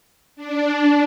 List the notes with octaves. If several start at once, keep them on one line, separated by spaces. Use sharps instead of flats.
D4